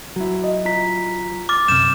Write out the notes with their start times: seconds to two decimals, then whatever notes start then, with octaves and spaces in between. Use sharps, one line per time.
0.16 F#3 E4 F#4
0.44 D#5
0.65 F4 A#5 B6
1.49 D6 F6 A6
1.68 F#2 C3 F6 G6 E7